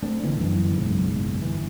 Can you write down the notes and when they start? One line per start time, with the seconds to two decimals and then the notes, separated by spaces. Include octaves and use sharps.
0.03 A3 C4 D4
0.24 A#1 A#2 D3 E3
0.38 G1 F#2 E3
0.78 F#1 B1 G#2
1.42 G1 E3